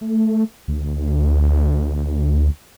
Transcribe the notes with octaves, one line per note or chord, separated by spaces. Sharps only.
A3
D2